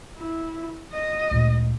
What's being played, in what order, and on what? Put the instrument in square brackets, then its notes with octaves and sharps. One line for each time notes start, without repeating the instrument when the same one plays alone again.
[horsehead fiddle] E4
D#5
[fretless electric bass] D2 A#2 G#3